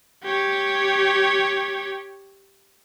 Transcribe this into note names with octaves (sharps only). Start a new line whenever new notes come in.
G4 C#5